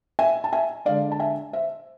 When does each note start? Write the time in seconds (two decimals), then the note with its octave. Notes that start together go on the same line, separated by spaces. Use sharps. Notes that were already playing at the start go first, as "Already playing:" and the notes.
0.19 E5 G#5
0.44 A5
0.52 E5 G#5
0.85 D3 G#3 D4 D5 F5
1.12 A5
1.19 E5 G#5
1.53 C5 E5